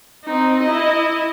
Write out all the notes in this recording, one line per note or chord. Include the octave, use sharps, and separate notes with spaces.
C4 D#4
E4 D#5